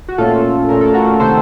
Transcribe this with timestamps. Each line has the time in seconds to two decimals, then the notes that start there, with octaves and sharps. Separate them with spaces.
0.08 F#4
0.18 A#2 A3 C#4 F4 A4
0.69 A#2 A3 C#4 A#4
0.81 A4
0.94 F#4 A#4
1.20 C3 D#3 A3 C4 A4 C5